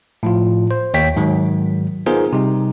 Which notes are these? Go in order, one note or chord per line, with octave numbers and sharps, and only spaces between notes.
A2 F3 F4
C5
D#2 C#5 G5 B6
G#2 D#3 F#3
B3 D#4 F4 G#4 A#4 C5
C3 G3 D#4